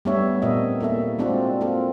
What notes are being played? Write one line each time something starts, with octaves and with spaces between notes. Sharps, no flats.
G3 A3 B3 D4 C#5 E5
A#2 C4 A#4 D#5 E5
A#3 E4 A4 E5
G#3 C4 D4 F4 F#4
A#3 C4 F4 A4